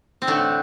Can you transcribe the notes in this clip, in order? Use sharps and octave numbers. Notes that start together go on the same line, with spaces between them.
C4
A2 D3 E3 A3 D4